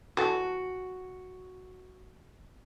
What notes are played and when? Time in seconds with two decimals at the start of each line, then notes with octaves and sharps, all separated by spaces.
0.17 E3 F#4 A4